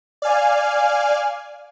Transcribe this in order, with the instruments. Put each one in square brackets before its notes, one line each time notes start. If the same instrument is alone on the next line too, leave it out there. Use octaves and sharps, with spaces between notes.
[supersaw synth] D5 F5 G#5 F6